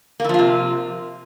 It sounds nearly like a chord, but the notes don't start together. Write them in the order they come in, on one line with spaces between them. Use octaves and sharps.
A#3 E3 F3 F4 C3